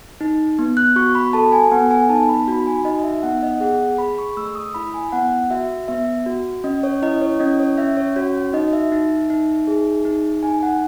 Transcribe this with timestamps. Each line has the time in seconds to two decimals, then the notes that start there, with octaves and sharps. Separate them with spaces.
0.21 D#4
0.59 B3
0.77 F#6
0.96 F#4 C#6
1.15 B5
1.33 A4 A5
1.52 G#5
1.72 B3 F#5
1.91 G#5
2.09 D#4 A5
2.29 B5
2.48 F#4 B5
2.67 G#5
2.85 D#4 D#5
3.04 E5
3.23 B3 F#5
3.43 D#5
3.61 G#4 F#5
3.98 G#4 B5
4.19 C#6
4.37 A3 E6
4.55 D#6
4.74 E4 B5
4.94 G#5
5.12 B3 F#5
5.50 F#4 E5
5.88 B3 E5
6.26 F#4
6.64 C#4 D#5
6.83 C#5
7.02 E4 D#5
7.22 C#5
7.39 C#4 D#5
7.60 C#5
7.77 C#4 E5
7.97 C#5
8.16 F#4 C#5
8.53 D#4 D#5
8.73 E5
8.92 D#4
9.30 D#4
9.67 G#4
10.05 D#4
10.43 D#4 G#5
10.63 F#5